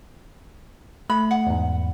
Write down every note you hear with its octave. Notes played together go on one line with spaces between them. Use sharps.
A3 B5
F#5
E2 G#2